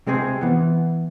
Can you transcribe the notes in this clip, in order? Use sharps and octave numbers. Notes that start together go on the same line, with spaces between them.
C3 G#3 C4 G#4 C5
E3 B3